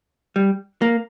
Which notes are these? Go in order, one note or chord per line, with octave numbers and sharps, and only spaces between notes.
G3
A#3